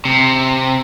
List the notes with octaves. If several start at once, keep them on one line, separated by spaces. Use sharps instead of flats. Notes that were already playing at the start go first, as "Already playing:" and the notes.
C3